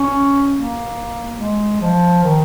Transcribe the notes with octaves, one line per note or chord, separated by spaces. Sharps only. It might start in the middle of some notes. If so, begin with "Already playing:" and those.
Already playing: C#4
A#3
G#3
F3
D#3